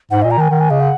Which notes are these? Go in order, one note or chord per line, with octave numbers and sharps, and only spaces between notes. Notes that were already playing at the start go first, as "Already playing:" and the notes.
G#2 F#5
A#2 D#5
A#5
D#3 G#5
D#3 F#5
G#5
C#3 D#5
F#5